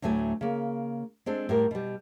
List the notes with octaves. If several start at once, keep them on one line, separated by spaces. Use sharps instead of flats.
D2 A2 F#3 A3 G#5
C#3 A#3
G#3 C4 D4 A4
A2 G3 A#4
B2 G3